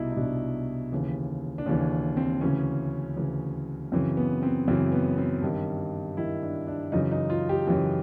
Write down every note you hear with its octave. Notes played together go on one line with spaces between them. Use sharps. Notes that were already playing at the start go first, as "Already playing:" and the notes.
Already playing: C2 B2 D#4 E4
D#4
C2 B2 D4
D#2 C#3 E3
D4
D#2 C#3 E3 C#4
C4
D2 C#3 E3 C#4
D2 C#3 E3
F#2 C#3 E3 C4
B3
C4
F#2 C#3 E3 C4
B3
C4
G2 D#3
G2 D#3 E4
D4
D4
F#2 C#3 E3 D#4
D#4
F4
G4
F#2 C#3 E3 G4